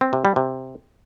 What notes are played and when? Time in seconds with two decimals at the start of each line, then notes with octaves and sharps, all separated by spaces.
0.01 C4
0.13 C3
0.25 G3
0.36 C3